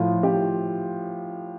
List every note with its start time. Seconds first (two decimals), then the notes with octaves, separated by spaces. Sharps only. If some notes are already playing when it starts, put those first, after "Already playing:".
Already playing: A2 F3 F4
0.23 G4